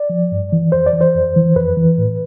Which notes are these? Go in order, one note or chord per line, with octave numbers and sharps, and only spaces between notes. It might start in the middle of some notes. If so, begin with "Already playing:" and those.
Already playing: D5
F3
G2
E3
F2 C5
D5
E3
C5
F2
E3
F2 B4
E3
A2